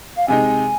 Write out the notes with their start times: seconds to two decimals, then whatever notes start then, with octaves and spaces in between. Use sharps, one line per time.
0.16 F5
0.28 C3 G#3 D#4 G#5